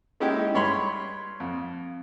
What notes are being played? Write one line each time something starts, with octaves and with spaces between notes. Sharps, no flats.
G#3 C#4 D#4 E4 G4
G2 C#5 B5 C6
F2